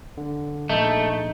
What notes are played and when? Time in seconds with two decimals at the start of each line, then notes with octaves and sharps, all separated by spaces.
0.17 D3
0.69 A#1 A3 D#4 G6